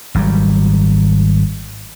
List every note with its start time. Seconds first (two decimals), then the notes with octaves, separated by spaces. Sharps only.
0.15 G#1 F#3 G3